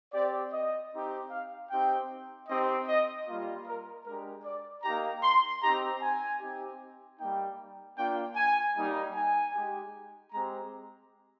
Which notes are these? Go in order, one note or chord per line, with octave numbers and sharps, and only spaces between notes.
C4 G4 D5
D#5
C4 D#4 G4
F5
C4 D#4 G4 G5
C4 D#4 G4 D#5
D#5
G3 A#3 F4
A#4
G#3 D4 G4 A#4
D5
A#3 D#4 G4 A#5
C6
C4 D#4 G4 A#5
G#5
C4 D#4 G4
G3 A#3 D#4 G5
A#3 D4 F4 G5
G#5
G3 A#3 D#4
G#5
G#3 D#4 G4
G#3 C4 G4 A#5